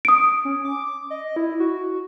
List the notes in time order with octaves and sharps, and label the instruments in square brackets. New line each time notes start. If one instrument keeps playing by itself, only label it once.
[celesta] D#6 D7
[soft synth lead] C#4
D6
D#5
E4
F#4